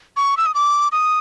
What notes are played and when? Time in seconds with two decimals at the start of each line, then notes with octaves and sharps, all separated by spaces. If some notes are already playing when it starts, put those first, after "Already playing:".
0.17 C#6
0.37 E6
0.46 D#6
0.54 D6
0.92 D#6